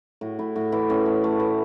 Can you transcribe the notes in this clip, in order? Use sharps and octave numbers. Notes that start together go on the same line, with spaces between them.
A2 F#4
A2 E4
A2 F#4
E3 E4
A2 C#4
A3
A3
E3